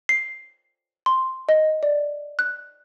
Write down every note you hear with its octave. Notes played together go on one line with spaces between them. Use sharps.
C7
C6
D#5
D5
F#6